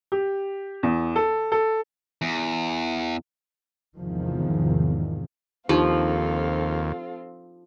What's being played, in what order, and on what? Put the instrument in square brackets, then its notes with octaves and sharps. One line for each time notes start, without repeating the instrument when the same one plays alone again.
[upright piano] G4
E2
A4
A4
[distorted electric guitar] E2
[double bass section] G#1 E2 C3 D#3 F3
[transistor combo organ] D#2 [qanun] F3 [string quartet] C4 F4 A4 [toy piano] D4 D#4 G4